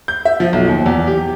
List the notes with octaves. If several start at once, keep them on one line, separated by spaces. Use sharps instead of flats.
G6
E5
F3
B1
D#2
E2
G4